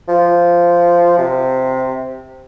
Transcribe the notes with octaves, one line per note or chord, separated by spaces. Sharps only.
F3
C3